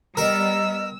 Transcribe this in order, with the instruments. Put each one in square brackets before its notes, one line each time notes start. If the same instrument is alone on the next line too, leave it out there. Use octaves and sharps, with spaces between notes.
[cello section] G3 B3 [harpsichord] A#4 [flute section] D#5 [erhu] E6